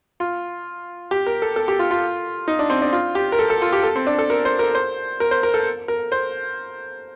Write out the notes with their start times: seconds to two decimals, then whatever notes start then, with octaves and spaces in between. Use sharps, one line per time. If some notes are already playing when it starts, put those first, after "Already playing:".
0.20 F4
1.11 G4
1.26 A#4
1.42 A4
1.56 A4
1.68 G4
1.79 F4
1.91 F4
2.48 D#4
2.59 D4
2.70 C4
2.82 D4
2.93 F4
3.15 G4
3.32 A#4
3.39 A4
3.50 A4
3.62 F4
3.73 G4
3.83 A4
3.96 C4
4.07 D4
4.19 A4
4.30 A#4
4.45 C5
4.59 A#4
4.75 C5
5.20 A#4
5.31 C5
5.43 A#4
5.54 A4
5.88 A#4
6.12 C5